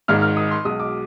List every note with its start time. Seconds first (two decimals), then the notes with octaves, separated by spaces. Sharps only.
0.08 G#1 G#2 D#3 G#3 F6
0.22 F6
0.37 D#6
0.51 C6
0.65 B1 B2 G#3 D#6
0.80 D6